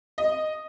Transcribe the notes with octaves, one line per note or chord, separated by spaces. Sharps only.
D#5